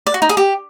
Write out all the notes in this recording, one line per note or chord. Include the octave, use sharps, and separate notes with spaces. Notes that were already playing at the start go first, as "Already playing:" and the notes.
D5
F#4
D#4
G#4
G4